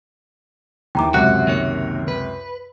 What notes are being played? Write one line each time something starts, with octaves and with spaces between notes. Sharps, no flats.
D#2 E3 G5 A#5 D6
C#2 F#2 C3 F#4 F#6
D#3 A#3 C#5
B4